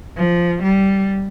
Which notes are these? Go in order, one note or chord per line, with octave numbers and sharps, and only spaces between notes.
F3
G3